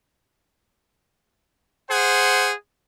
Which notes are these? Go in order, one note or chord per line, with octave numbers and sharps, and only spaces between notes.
G#4 C5 F#5